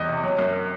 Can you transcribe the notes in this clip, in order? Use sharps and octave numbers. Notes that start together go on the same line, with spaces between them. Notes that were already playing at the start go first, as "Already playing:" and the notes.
Already playing: E2 G3 D#5
C3
F#3
F#2